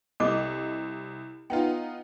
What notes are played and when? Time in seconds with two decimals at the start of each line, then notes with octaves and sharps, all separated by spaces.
0.20 C2 A4 D#5 D6
1.50 B3 D#4 F4 G5